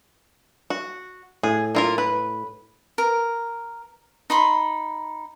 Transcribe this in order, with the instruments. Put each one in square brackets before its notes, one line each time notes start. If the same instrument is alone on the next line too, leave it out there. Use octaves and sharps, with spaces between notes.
[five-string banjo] F#4
[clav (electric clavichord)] A2 [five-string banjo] G#4
[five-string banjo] A#3 F4 A#4
B4
[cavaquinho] A#4
D#4 B5 C6